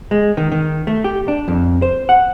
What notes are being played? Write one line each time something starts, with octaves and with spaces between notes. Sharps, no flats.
G#3
D#3
D#3
A3
G4
D4
F2
C5
F#5